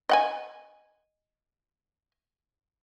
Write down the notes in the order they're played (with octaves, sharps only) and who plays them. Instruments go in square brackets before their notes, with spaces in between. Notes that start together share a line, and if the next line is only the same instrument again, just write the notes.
[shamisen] D#5 F#5 G#5